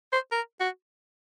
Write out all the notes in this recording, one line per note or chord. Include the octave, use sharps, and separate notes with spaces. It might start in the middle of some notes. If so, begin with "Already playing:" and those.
C5
A#4
F#4